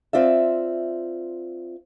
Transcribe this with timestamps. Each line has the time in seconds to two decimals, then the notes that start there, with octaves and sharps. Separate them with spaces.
0.13 C4 F4 D5 E5